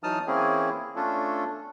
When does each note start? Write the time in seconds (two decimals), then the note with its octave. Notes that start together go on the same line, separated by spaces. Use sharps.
0.03 E3 F#3 D#4 A5 D#6 F6
0.27 E3 A#3 C4 C#4 E4 G#4
0.96 A3 C#4 D4 F4 A4